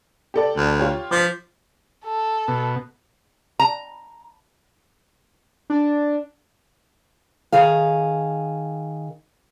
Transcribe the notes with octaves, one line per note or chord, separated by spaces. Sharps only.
G4 A4 D5
D2
F4 G4 C#5
F3 D6 B6
A4
B2
A#5
D4
D#3 G#4 F5